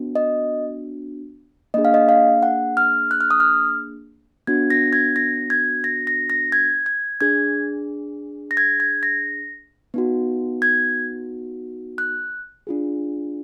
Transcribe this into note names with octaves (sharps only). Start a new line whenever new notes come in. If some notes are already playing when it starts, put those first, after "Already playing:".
Already playing: B3 D4 F#4
D#5
A#3 D4 G#4 D#5
F5
D#5
F5
F#5
F6
F#6
F6
D#6
F6
B3 D4 F#4 G#6
A#6
G#6
A#6
G#6
A#6
A#6
A#6
G#6
G#6
D4 G#4 G#6
A#6
G#6
G#6
A#6
B3 D#4 F#4
G#6
F#6
D4 F4 G#4